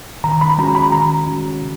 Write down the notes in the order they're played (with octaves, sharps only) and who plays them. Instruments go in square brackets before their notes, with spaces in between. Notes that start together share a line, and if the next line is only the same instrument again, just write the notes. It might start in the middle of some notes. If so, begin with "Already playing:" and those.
[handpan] D#3 [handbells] A#5
[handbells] B5
[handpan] G#3 C#4 F#4 [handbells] A#5
[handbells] B5
[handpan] D#3 [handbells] A#5
[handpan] G#3 C#4 F#4
C#3